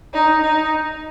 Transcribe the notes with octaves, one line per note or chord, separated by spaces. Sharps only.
D#4
D#4